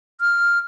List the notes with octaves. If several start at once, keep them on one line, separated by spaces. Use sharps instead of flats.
F6